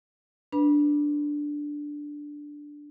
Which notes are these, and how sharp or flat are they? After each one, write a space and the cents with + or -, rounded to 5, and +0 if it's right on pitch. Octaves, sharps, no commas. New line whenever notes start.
D4 +0 B4 +0 B5 -25